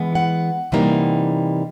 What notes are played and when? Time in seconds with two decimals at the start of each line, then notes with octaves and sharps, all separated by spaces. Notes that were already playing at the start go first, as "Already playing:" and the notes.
Already playing: E3 G#3 B3
0.15 F#5
0.72 C3 E3 G3 A#3 D#4